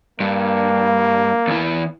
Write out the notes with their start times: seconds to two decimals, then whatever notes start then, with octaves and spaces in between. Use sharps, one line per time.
0.20 G2 A#3
1.48 E2 E3